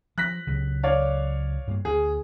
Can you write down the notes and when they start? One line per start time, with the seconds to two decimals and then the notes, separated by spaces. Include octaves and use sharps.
0.18 F3 F#6 A#6 B6
0.47 C#2 C#3 F#3
0.83 C#5 D5 F5
1.67 G2 A#3
1.85 D2 G#4